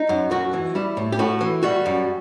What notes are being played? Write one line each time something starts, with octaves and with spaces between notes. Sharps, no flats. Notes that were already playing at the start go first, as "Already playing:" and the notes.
Already playing: D#4
F#2
F#2 F#4
E3
G3 E4
A2
G4
A2 F#4
E3
G3 F#4
F#2